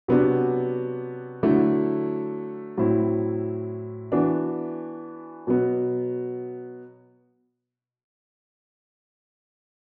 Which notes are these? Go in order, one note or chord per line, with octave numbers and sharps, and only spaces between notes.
C3 F#3 B3 D4 F#4
D3 F#3 A3 E4
A2 F#3 C4 E4
E3 B3 D4 F#4
B2 F#3 B3